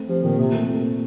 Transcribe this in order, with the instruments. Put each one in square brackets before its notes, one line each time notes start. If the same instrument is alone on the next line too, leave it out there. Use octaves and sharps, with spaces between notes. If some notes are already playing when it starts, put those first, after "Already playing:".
Already playing: [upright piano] A3 C4
[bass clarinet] F3 [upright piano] G4
[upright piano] A#2 [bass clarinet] D#3
[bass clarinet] C3 [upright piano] C4
[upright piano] A3